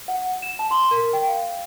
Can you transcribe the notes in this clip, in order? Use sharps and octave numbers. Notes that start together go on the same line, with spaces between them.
F#5
E7
A5
C6
A#4
G5
F5